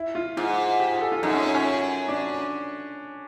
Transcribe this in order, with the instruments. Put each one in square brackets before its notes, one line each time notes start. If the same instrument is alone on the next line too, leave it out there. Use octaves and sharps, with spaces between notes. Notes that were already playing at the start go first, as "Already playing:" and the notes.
Already playing: [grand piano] E4
F4
[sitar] G#2 [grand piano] F4
[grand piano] G4
G#4
A4
F4
[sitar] F#2 [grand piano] D#4
[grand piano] C#4
C#4
C#4
D4